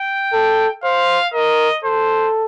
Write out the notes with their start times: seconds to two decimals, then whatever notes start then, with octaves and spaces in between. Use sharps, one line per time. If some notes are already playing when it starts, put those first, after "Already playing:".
Already playing: G5
0.33 A4
0.84 C5 F5
1.34 A#4 D#5
1.84 A4 C5